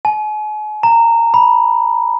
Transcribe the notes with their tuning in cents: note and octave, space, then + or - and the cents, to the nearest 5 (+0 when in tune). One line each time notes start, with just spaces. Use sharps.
G#5 +40
A#5 -15
B5 -15